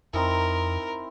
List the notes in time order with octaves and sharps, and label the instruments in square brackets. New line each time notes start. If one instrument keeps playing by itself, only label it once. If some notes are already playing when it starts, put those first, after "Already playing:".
[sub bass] F2 [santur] C4 D#4 E4 [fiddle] A#4